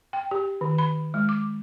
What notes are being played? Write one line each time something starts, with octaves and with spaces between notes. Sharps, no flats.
G5
G4
D#3
B5
G#3
D6